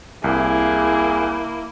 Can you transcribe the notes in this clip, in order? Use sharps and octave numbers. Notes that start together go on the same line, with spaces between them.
C2 A#3 E4 G#4